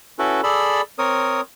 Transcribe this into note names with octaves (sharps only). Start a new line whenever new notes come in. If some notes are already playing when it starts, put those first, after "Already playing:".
C#4 E4 F#4 A4 B4
G#4 A4 D5 B5 E6
C4 A#4 C#5 D#6